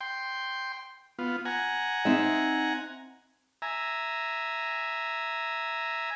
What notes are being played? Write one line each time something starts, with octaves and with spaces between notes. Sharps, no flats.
G5 C6
B3 F4
F#5 G#5 A#5
C4 D#4 E5
E5 G#5 A#5